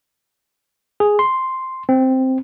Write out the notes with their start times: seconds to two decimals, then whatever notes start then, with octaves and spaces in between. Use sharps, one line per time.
1.00 G#4
1.19 C6
1.89 C4